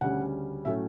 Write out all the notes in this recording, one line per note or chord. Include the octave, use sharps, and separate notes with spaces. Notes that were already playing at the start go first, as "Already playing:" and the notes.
D2 C#3 G3 C#4 F#5
A2 F#3 A3 C#4 E5